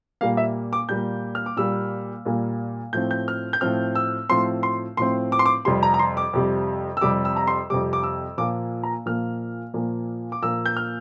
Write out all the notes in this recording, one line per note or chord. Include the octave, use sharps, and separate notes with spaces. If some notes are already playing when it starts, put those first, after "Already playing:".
A#2 G3 A#3 F5
E5
D6
A#2 G3 A#3 G6
F6
D6
A#2 G3 A#3 E6
A#2 G3 A#3
A2 F3 C4 G6
G6
F6
G6
A2 F3 C4 F6
E6
A2 F3 C4 C6
C6
A2 F3 C4 C6
D6
C6
D6
F2 C3 G3 C6
A#5
A#5
C6
D6
F2 C3 G3
E6
F2 C3 G3 D6
E6
A#5
C6
F2 C3 G3 D6
D6
E6
A#2 F3 A#3 D6
A#5
A#2 F3 A#3 F6
A#2 F3 A#3
D6
A#2 F3 A#3 E6
G6
F6